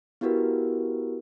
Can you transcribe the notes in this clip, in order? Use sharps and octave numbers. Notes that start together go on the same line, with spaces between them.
B3 E4 F#4 G4 A#4 B4